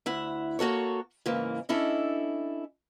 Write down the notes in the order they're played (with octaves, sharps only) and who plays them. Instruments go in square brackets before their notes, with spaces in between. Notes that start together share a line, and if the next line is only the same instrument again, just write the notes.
[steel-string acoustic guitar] D2 E4 F#5
A#3 F#4 A4 C#5
G#2 C#3 E3 A#3
C#4 D4 E4 A4 D#5